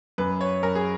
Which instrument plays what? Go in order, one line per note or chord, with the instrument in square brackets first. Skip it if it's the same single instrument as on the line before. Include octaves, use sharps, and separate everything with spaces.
[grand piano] F#2 B4
C#5
F#2 A#4
G#4